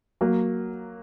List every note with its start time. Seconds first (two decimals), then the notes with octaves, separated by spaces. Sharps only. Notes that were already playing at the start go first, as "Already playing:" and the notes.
0.21 F#3 A#3